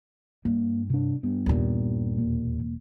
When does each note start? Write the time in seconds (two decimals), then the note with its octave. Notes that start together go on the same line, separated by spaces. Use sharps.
0.45 G2 A#3
0.90 C3 D4
1.23 G2 B3
1.46 D#2 A#2
2.18 E1 A#3